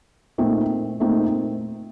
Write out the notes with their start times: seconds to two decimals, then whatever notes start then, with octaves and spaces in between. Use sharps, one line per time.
0.38 A#2 A3 C4 D#4
1.00 A#2 A3 C4 D#4